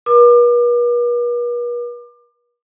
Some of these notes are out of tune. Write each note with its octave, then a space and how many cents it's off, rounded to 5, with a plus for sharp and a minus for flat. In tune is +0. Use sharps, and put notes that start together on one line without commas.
B4 -45 D6 +30